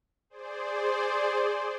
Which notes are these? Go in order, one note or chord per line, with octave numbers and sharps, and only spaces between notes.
G#4 C5 D5